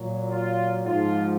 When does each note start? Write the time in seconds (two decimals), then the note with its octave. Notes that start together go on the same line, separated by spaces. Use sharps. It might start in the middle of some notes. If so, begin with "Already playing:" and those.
Already playing: A#2 F#3
0.30 F4
0.85 G#2 F3 F4